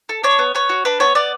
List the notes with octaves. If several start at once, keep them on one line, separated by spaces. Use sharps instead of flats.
A4
D4 C#5
B3
B3 C#5
F#4
D4 B4
B3 C#5
B3 D5